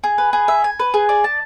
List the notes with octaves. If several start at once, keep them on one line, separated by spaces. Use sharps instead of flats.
G#4
B4
G#4
E5
G#5
B4
G#4
D5
A5